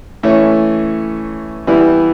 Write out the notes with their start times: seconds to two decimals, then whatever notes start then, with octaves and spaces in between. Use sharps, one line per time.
0.23 E3 A3 C#4
1.67 E3 G3 B3 E4